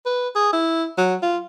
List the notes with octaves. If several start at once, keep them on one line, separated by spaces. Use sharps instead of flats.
B4
G#4
E4
F#3
F4